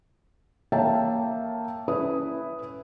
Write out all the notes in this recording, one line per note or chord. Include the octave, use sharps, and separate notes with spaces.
A#3 C#5 E5 G5 A5
C#4 E4 B4 D#6